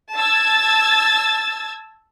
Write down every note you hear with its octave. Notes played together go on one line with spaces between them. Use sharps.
A5 E6 G#6 A6